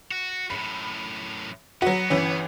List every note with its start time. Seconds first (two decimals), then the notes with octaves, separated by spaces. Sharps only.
0.11 F#4
0.50 F#2 A2 B5
1.82 F#3 B3 F#4
2.10 G1 E3 C#4